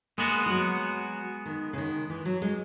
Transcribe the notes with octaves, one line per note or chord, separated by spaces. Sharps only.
G#3 A#3 B3 F#4
E3
F#3
D#3
C#3
D#3
E3
F#3
G#3